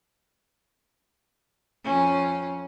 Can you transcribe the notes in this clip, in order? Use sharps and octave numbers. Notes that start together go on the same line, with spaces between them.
F2 C#4